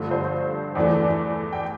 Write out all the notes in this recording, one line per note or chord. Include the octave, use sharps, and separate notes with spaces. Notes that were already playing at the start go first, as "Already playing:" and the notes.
Already playing: G2 D3 F3 A3
C5
E2 E3 A3 D5
G5